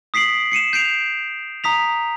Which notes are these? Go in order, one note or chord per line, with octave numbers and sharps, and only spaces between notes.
D#6 B6 C7 D7 F#7
C7 C#7 D#7 E7
G6 C7 D7 F7
A#5 D#6 B6 F7